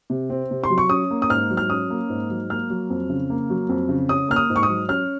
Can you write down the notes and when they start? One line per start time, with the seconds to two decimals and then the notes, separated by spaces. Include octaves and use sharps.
0.10 C3
0.30 C4
0.51 C3
0.64 C6
0.70 F#3
0.78 C#6
0.89 C#4 D#6
1.11 A#3
1.22 D#6
1.30 G#2 F6
1.50 F#3
1.57 F6
1.70 C#4 D#6
1.90 A#3
2.09 G#2
2.30 F#3
2.50 A#3 F6
2.70 F#3
2.90 F2
3.10 C#3
3.30 A#3
3.50 F#3
3.69 F2
3.89 C#3
4.09 C#4 D#6
4.28 A#3 F6
4.36 D#6
4.50 G#2
4.56 C#6
4.63 D#6
4.69 F#3
4.89 C#4 F6